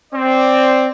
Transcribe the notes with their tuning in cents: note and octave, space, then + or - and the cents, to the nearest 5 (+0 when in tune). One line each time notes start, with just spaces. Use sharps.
C4 +0 D5 +0